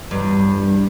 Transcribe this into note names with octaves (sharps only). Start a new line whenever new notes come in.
E2 G2